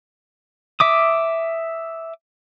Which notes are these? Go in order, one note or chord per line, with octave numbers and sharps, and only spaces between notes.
E5 D6 D#6